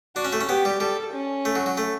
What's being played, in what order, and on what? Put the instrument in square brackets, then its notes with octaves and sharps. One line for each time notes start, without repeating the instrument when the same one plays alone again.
[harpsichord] D4 [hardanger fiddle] F#4
[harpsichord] C#4
A3
C#4
[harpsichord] B3 [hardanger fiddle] G4
[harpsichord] G3
[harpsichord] G3 [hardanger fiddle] A4
[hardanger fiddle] C#4
[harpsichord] A3
F#3
F#3
A3